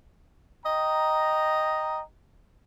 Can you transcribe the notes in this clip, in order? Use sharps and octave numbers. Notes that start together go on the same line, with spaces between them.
D#5 G5 A#5